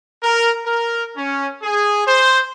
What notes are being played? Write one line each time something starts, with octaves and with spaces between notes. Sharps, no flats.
A#4
A#4
C#4
G#4
C5